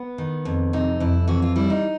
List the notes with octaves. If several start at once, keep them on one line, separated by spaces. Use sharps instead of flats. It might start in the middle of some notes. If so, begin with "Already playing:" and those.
Already playing: B3
D#3
F2
C3 D#4
F2 E4
E3 F#4
F4
G3 E4
D#4